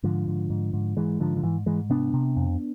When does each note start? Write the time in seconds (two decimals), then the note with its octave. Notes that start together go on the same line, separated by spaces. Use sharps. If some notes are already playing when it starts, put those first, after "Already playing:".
0.03 G#2 D3 F3
0.28 G#2
0.50 G#2
0.73 G#2
0.97 G#2 E3 G#3
1.20 G#2 D3 F3
1.37 D3
1.43 G#2 E3
1.66 G#2 E3 G#3
1.90 C3 B3 D4
2.14 C3
2.37 F2